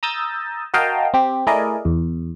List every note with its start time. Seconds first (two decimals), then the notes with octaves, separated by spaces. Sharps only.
0.03 A#5 D#6 E6 G6 A6
0.74 F#4 A#4 D#5 F5 G5 A5
1.14 C4 G4
1.47 A3 E4 G#4 A#4 D5 D#5
1.85 E2